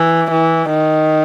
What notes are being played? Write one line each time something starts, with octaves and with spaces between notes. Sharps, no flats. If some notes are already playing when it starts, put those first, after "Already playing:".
Already playing: E3
E3
D#3